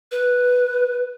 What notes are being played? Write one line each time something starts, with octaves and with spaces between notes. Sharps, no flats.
B4